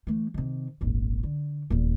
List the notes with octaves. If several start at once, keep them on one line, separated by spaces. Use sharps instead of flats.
E3 A3
C3 D#3
D#1 G#1
D3
D#1 E2